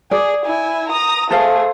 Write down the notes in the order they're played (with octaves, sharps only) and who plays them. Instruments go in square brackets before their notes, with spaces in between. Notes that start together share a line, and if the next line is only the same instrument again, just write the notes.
[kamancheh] G#4 [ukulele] D5
[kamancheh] E4 G#5
A#5 D#6
[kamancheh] A3 G#4 [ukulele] A4 C5 F5